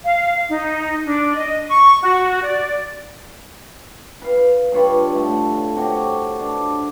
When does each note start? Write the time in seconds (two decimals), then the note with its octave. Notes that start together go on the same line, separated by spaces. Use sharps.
0.03 F5
0.49 D#4
1.04 D4
1.34 D#5
1.69 C#6
2.03 F#4
2.42 D5
4.22 B4 F5
4.72 G2 F4 C#5 B5
5.15 A2 A3
5.76 C3 F#4 G4 C#5
6.40 D4